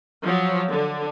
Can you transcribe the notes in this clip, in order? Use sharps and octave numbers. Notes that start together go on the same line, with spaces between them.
F3 F#3
D3